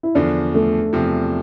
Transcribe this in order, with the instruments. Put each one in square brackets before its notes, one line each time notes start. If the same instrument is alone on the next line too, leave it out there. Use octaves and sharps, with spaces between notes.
[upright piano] E4
[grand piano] E2 D3 F3 [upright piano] D4
[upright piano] A3
[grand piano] E2 C3 F3